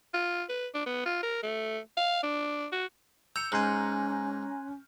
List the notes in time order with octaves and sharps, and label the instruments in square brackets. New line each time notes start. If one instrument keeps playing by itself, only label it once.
[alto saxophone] F4
B4
D4
B3
F4
A#4
A3
F5
D4
F#4
[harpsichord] A#5 [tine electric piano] E6 [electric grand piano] G6 C#7
[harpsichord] G#2 [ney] C#4 [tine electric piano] G#5 C6 F#6 [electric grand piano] A#5 F6